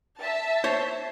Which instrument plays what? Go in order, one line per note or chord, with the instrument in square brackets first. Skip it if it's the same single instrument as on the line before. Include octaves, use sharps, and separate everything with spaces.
[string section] E5 A5
[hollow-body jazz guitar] C5 C#5